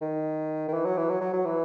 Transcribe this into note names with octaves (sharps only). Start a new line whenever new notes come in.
D#3
D#3
E3
F#3
E3
F#3
F#3
F#3
E3